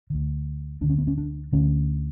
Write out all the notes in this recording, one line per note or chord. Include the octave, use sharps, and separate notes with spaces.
D2 D3
D2 D3 D4
C#4
B3
C#4
D4
D2 D3 C#4